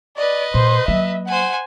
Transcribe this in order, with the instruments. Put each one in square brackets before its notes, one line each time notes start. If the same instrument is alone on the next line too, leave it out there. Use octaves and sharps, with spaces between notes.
[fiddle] B4 D#5 [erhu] D5
[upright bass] A#2 [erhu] C5
[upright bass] F#3 A#3 [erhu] E5
[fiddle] C5 G#5 [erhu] F#5